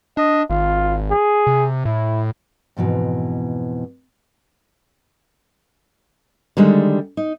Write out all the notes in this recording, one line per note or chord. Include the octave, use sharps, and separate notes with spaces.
D4 D#5
G#1 F4
G#4
C3
A2 E4
F2 G#2 B2 E3
D3 D#3 G3 G#3
D#4